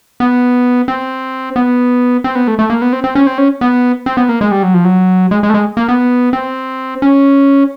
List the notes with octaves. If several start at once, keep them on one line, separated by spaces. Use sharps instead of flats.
B3
C4
B3
C4
B3
A3
A3
A#3
B3
C4
C4
C#4
C4
C#4
B3
C4
B3
A#3
G#3
G3
F#3
F3
F#3
G#3
G#3
A3
G#3
A#3
B3
C4
C#4